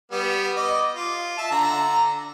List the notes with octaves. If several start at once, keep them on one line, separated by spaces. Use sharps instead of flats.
G3 B3
D#5 D6
F4
E5 A5
D3 A#5